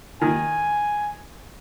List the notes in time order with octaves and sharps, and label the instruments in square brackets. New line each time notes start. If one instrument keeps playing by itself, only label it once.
[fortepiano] D#3 [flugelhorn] G#5